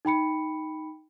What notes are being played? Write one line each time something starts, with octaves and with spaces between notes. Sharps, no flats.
D#4 G5 B5 C#7